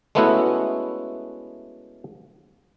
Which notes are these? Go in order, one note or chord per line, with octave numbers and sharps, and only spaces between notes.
G#3 A3 B3 C#4 E4 F#4